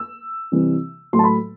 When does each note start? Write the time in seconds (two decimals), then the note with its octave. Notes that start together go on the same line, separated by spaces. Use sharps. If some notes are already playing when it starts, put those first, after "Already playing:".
Already playing: E6
0.52 C3 E3 G3
1.13 A2 F#3 A3 C6
1.19 A5
1.24 B5